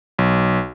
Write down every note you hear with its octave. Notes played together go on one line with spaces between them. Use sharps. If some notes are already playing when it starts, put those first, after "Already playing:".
B1